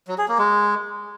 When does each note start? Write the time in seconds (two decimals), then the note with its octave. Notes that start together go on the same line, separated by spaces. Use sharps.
0.08 F#3
0.18 G#4
0.28 A#3
0.38 G#3